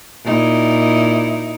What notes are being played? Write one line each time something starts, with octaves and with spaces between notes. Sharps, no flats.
A#2 D#4 E4